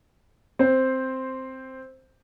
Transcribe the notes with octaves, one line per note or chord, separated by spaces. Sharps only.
C4 C5